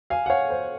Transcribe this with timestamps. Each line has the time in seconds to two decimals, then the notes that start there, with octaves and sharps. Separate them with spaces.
0.10 F5 G#5
0.26 F#5
0.30 C#5 F5
0.50 C5